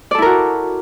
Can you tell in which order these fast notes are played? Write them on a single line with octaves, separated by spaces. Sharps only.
D5 A4 E4 A#4 F#4